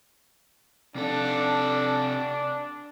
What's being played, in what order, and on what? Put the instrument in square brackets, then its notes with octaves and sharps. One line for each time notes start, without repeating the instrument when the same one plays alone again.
[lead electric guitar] C3 A4 [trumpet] D4